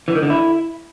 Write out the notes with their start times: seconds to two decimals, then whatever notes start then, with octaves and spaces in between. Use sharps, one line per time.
0.08 E3
0.15 D#3
0.23 D3
0.30 E4